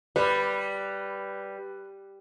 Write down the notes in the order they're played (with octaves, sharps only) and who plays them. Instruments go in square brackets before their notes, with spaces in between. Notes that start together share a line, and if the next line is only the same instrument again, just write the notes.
[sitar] G3 [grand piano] B4 B5